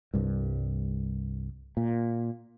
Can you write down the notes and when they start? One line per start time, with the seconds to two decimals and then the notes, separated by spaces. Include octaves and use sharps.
0.14 C2 G2
1.77 A#2